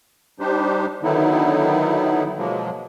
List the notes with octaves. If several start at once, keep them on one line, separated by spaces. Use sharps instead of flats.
G3 D4 D#4 G4 C5
D3 D#3 F#3 B3 D#4 E4
B2 F3 F#3 G#3 A#3